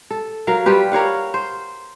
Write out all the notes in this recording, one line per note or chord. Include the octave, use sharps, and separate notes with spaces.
A4
F#3 A#4 F5
G3 F4 G4 B4
A#4 C#5 F5 F#5
C5